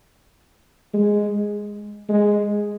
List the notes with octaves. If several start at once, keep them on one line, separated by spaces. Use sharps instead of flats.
G#3
G#3